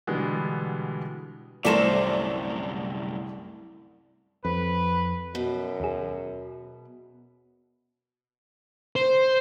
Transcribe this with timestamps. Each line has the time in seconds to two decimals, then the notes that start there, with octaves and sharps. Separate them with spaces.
0.07 B2 D3 E3 G3 G#3 B3
1.65 C2 F#2 C3 A3 A#4 C5 D5 E7
4.45 F2 B4
5.35 F#2 B2
5.80 D#2 G#4
8.96 C5